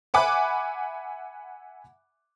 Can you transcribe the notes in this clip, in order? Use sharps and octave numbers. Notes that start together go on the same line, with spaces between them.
E5 F#5 G#5 B5 D6 F#6